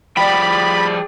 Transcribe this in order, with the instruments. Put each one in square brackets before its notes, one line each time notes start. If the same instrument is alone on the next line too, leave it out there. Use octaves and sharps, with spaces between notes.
[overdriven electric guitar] F3 G3 [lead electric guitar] G#4 G5 [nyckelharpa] D5 [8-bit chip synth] B5